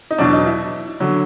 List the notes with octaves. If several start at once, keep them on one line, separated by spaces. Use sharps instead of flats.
D#4
E2 B2 F#3 D4
D#4
E4
D3 F#3